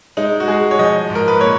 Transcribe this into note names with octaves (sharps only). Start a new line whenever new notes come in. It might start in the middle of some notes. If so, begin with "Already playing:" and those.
G#3 D#4
F#4
G#3 G#4
C#5
F3 D#5
G#2
A#4
B4
A#2 C#5